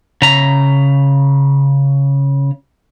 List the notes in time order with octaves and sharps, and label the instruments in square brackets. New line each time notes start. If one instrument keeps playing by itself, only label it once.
[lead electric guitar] C#3 A#5